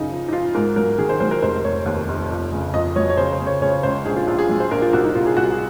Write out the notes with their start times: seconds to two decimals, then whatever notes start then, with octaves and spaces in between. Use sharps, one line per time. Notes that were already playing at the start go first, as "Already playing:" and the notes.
Already playing: F#2 C#3 D#4
0.11 F3
0.28 D#4
0.33 F3 F4
0.55 G#2 A#4
0.76 F#3 A#4
0.98 D#3 G#4
1.09 C5
1.20 F#3 C5
1.31 A#4
1.42 F1 C5
1.64 F1 C#5
1.86 D#2
2.08 F1
2.30 F2
2.52 C#3
2.74 F2 D#5
2.96 F#3 C#5
3.10 C#5
3.17 C#3 C5
3.32 C5
3.39 C#3
3.47 C#5
3.62 C#3 C#5
3.83 C#2 C5
4.05 A#1 G#4
4.16 F4
4.27 A#1 F4
4.39 G#4
4.49 F#3
4.60 C5
4.71 A#1 A#4
4.82 F4
4.93 C2 F#4
5.04 D#4
5.15 C2 F4
5.26 G#4
5.37 C2 F#4
5.52 G#4